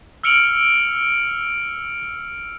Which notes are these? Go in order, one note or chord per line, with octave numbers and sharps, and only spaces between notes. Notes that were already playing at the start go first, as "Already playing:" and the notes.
E6 F6 C#7 D7 F7 F#7